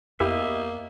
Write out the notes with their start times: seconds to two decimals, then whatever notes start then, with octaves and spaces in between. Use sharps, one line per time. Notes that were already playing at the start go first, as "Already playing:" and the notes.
0.20 F2 A#3 B3 E4 G4 D#5 E5